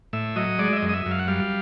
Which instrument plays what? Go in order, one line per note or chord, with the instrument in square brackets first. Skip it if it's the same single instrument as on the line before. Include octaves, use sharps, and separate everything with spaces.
[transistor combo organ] A2 E5
F#3 D#5
G#3 D5
E5
D#5
F#2
D#5
E5
F#2
F5
F#5
G3 F5